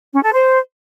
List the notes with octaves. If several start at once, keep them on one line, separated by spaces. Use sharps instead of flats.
C#4
A4
C5